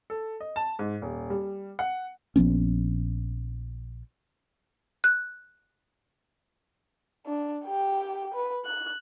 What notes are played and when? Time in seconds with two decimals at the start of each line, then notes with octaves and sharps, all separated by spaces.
0.10 A4
0.40 D#5
0.56 A5
0.79 G#2
1.02 D#1
1.30 G3
1.79 F#5
2.36 A#1 F3 B3 C#4
5.04 F#6
7.26 D4
7.66 G4 G5
8.34 B4
8.66 F#6